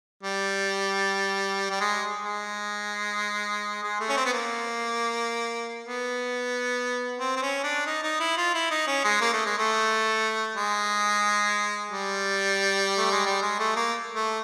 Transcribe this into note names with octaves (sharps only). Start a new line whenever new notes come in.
G3
G3
G#3
G#3
G#3
A3
C#4
C4
B3
A#3
B3
C4
C4
C#4
D4
D#4
D#4
E4
F4
E4
D#4
C#4
G#3
A#3
A3
G#3
A3
G#3
G3
A3
G#3
G3
G#3
A3
A#3
A3